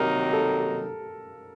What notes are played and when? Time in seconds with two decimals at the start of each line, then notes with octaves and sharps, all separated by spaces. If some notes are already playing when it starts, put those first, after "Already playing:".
Already playing: C3 D#3 F#3 A#3 D#4 A#4
0.33 A4